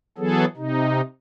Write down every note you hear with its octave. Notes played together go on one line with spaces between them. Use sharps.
E3 F#3 B3 G#4 A4
C3 D#4